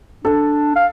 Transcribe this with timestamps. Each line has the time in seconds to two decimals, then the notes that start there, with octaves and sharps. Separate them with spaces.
0.25 D4 A4
0.76 F5